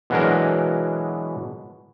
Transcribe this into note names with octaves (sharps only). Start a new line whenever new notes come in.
B2 E3 F#3 G#3 D4 A#4